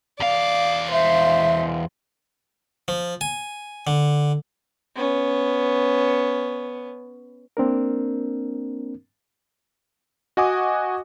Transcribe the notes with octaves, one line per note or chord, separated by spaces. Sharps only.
E2 D5 F5
C5 E5
F3
G#5
D3
B3 C#4
A#3 C4 D4 A#4
F#4 D#5 F#5 G#5 D6 D#6